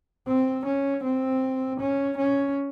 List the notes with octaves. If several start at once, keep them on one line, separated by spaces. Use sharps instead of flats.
C4
C#4
C4
C#4
C#4